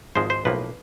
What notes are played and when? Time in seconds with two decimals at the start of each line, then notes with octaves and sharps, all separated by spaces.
0.15 G#1 G#2 F3 G#3 C5
0.30 C5
0.45 B1 A2 F3 A#3 B4